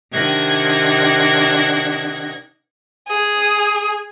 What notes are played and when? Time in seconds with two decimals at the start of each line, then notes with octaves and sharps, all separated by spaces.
0.10 C3 D#3 D4 F#5 G#6 A#6
3.08 G#4